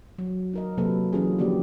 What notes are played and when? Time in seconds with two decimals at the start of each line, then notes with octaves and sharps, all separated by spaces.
0.18 F#3
0.54 D#4 A#4 D#5
0.78 C3 F#3 A#3 A4 B4
1.13 E3 F#3 C#4 F4 G#4
1.39 D3 F3 A#3 F#4 G4 D5